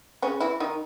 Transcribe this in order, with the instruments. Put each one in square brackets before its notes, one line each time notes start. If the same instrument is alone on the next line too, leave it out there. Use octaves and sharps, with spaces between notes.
[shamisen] C#3 C#4
E3 E4
D#3 D#4